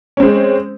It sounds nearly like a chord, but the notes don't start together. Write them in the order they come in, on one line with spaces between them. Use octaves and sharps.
C#4 C4 G#3